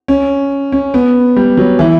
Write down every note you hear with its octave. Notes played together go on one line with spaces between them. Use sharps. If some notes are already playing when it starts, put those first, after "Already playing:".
C#4
C#4
B3
G3
F#3
E3